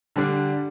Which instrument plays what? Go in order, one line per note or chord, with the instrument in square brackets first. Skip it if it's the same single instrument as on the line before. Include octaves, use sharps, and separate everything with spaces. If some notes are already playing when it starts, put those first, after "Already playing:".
[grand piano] D3 G3 D4